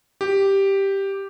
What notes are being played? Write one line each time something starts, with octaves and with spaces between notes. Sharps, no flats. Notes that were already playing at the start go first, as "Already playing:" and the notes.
G4